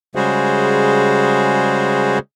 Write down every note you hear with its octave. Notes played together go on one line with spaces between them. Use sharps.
C#3 G3 G#3 F#4 G#4 C5